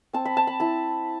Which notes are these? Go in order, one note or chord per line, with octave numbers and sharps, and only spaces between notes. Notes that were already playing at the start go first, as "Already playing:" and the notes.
C4 A5
B5
A5
B5
E4 A5